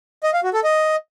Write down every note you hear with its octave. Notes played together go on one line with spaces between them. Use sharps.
D#5
F5
F#4
A4
D#5